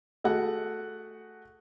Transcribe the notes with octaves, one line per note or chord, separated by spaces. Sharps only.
A3 F#4 G#4 F#5